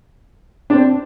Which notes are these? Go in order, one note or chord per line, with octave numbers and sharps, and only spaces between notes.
D4
C4